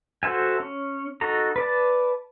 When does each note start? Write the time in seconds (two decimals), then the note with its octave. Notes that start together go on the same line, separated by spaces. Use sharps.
0.23 F#4 A4 C5 E5 G#5
0.60 C#4
1.21 D#4 F#4 A4 A#5
1.56 B4 D5 A5